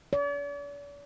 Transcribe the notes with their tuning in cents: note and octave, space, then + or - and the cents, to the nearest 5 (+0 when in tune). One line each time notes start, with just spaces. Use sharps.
D5 -45